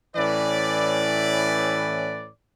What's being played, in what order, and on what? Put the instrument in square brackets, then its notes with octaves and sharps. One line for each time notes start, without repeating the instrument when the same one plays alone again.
[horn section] A2 E3 C#4 B4 D5